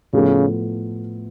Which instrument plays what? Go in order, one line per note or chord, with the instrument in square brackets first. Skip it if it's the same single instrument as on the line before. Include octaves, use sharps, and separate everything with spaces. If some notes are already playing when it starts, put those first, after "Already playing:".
[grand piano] A2 F3 B3 F4 A4 [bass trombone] C#3